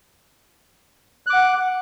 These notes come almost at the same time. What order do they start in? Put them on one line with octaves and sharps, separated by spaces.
F#6 D6 F#5